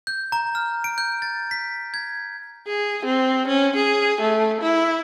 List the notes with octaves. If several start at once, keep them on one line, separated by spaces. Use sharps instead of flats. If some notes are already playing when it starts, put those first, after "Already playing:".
G6
A#5
F6
D7
G6
A6
B6
G#6
G#4
C4
C#4
G#4
A3
E4